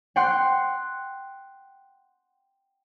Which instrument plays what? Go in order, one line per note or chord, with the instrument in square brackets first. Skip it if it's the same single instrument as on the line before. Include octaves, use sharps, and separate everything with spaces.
[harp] F#5 G5 C6 F#6